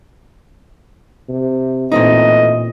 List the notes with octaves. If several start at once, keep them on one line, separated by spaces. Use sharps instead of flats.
C3
A1 A#2 C4 D#4 D#5